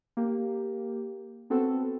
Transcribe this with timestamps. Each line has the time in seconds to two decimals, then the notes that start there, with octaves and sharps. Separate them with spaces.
0.17 A#3 G4
1.50 B3 C4 F#4 A4